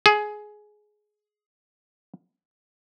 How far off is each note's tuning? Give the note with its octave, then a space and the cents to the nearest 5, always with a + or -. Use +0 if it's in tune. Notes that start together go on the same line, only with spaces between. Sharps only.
G#4 +15